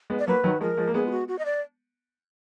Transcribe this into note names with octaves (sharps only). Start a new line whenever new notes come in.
G#3 B3
D5
F#3 A#3 B4
D#3 F#3
F3 G#3 A#4
F3 G#3
A#3
G#3 B3 G#4
F4
F#4
F#4
D#5
D5